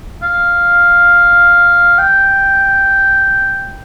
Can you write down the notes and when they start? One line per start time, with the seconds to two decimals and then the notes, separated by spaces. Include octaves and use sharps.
0.23 F5
1.98 G5